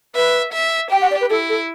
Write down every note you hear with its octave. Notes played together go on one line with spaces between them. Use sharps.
B4 E5
E5
G4 G5
F#5
D5
B4
E4 A4
A4